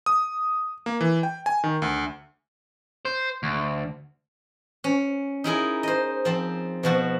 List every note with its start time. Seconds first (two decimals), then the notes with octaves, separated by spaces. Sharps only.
0.06 D#6
0.86 A#3
1.01 E3
1.23 G5
1.46 G#5
1.64 D#3
1.82 D2
3.05 C5
3.43 D2
4.84 C#4
5.44 D#4 E4 G#4 A#4
5.83 C5 D#5
6.25 F3 C4
6.83 B2 F3 F#4